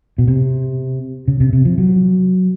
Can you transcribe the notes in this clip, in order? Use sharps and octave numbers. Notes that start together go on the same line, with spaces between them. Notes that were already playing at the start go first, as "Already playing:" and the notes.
B2
C3
C#3
C3
C3
F3
F#3